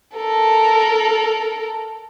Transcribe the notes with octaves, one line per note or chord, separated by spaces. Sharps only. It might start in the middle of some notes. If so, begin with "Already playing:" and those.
A4 A#4